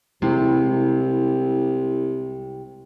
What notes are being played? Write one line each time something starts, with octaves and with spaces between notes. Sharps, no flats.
C2 C3 G#3 E4